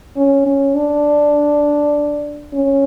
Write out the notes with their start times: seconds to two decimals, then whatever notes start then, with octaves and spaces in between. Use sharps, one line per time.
0.17 C#4
0.47 C#4
0.75 D4
2.53 C#4